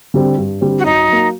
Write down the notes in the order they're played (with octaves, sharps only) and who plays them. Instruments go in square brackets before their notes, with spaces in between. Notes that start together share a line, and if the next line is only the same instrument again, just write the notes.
[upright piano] D3 G3 C4
G2
D3 G3 C4
[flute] F#4
[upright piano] F#2 [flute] D#4
[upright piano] F#3 A#3